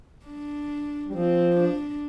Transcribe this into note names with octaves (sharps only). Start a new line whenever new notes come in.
D4
G3
F3 C4
D4